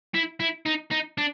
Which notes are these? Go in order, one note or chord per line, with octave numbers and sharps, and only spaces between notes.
E4
E4
D#4
D#4
D4